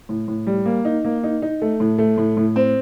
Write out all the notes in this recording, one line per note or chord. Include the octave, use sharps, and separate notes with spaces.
A2
A2
G3
A#3
D#4
A#3
D#4
D#4
A3
A2
A3
A2
A2
C4